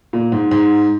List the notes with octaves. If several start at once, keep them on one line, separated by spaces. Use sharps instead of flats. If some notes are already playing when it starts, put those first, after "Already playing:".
A#2
G#2
G#2